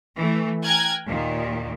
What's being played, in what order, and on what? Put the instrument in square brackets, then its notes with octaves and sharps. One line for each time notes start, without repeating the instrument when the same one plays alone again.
[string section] E3 A3
G5 G#5 A#5 F6 F#6 G#6
D#2 A#2 D#3